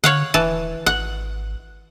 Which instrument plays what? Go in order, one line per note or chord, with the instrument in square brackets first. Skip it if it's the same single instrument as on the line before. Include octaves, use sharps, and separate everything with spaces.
[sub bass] D3 [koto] C#5 F5 F#5
[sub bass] D#1 [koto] E3 A5
[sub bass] G#1 [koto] F#5